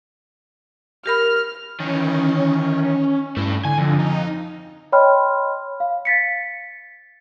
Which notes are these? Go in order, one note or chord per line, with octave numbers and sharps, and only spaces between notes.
G4 A#4 B5 F6
D#3 E3 C#4
G2 A3 E4
D3 G#5
F2 D3
D#4
C#5 D#5 G5 B5 C6 F6
F5
A6 B6 C#7